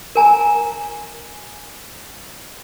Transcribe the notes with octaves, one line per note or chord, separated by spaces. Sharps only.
A#4 G#5 A#5